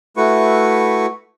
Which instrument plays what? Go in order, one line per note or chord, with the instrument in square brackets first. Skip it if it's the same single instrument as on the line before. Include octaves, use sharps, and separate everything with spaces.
[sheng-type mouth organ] A3 E4 F#4 B4 C#6